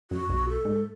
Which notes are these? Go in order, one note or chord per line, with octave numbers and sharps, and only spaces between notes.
F#2 F#4
B1
A4
G#2